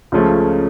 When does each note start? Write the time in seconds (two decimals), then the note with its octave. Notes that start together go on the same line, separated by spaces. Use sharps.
0.12 C#2 C#3 F3 A3 C#4